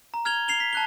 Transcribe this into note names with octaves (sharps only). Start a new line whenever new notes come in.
A#5
F6 G#6 F7 G7
C7 F7 G7
B6
A5 F#6 G7